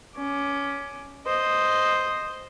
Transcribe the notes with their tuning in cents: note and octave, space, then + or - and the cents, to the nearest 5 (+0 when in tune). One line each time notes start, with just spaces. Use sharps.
C#4 +15 D6 +0
C5 +0 D#5 +0